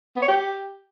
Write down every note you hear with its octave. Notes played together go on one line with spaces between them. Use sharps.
B3
C#5
G4